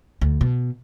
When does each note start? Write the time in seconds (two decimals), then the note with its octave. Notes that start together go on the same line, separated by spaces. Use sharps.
0.21 D2
0.41 B2